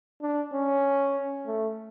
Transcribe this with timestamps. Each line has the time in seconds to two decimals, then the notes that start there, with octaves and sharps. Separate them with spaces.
0.22 D4
0.53 C#4
1.46 A3